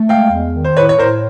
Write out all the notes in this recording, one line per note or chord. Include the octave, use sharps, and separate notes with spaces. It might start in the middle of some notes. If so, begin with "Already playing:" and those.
Already playing: A3
G#3 F5 G5
E2
D#3
C5
A2 B4 C#5
C#5
A2 A#4 C5